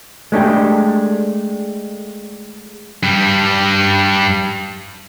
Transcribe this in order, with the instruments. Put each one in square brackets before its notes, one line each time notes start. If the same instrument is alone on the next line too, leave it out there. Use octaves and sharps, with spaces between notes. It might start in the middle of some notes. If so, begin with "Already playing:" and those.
[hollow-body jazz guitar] G#3 A3 D4 G4
[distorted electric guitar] G2 G3